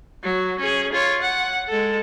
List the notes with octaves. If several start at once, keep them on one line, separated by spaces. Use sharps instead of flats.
F#3
C#4 G#4
F4 C#5
F#5
G#3 A4